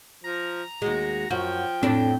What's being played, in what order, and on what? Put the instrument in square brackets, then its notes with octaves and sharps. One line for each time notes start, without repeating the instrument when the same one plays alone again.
[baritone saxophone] F3 [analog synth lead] A#5
[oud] D#2 G#3 [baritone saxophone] F#4
[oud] F#2 F#4 [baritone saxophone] F3 [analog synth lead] G5
[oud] F2 A2 D4 [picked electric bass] C4